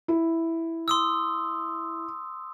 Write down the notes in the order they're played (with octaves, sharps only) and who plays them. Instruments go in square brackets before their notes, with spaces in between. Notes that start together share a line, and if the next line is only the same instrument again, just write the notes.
[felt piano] E4
[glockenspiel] C6 D#6 E6